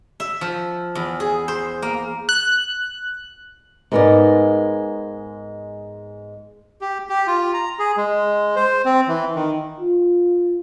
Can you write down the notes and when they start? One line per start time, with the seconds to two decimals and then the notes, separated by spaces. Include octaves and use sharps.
0.20 E5
0.41 F3
0.95 E2
1.20 G#4
1.48 C5
1.82 A#3
2.29 F#6
3.92 G#2 G#3 B3 G4 A#4 D5
6.81 G4
7.09 G4
7.27 F4
7.54 A#5
7.79 G#4
7.97 G#3
8.56 C5
8.85 C4
9.08 E3
9.35 D#3
9.80 F4